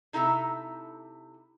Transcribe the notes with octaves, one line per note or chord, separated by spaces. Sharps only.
C3 D#4 E4 A4 E5 A#5